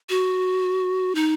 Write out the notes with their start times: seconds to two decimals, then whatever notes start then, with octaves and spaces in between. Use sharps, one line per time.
0.09 F#4
1.15 D#4